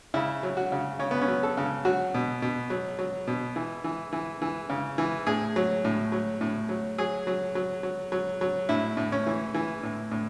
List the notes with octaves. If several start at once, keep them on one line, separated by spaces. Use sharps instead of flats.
C#3 E4
F#3
F#4
C#3
C#3 C#4
B3
C#4
F#3
A4
C#3
F#3 F#4
B2
B2
F#3
F#3
B2
E3
E3
E3
E3
C#3
E3
A2 G#4
F#3
A2
F#3
A2
F#3
F#3 G#4
F#3
F#3
F#3
F#3
F#3
A2 E4
A2
C#4
E3
E3
A2
A2